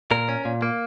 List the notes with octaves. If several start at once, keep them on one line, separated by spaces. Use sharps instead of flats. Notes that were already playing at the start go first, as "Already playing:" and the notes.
A#2 A#4
C#4
A#2
A#3